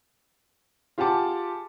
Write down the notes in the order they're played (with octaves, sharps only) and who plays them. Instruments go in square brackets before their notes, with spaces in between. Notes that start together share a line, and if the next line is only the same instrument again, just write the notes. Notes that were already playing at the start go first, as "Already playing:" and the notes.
[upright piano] F4 G4 G#4 F#5 A5 D6